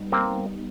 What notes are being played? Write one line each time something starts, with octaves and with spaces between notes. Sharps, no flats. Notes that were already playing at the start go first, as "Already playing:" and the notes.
Already playing: G3 B3 D#4
A#3 C4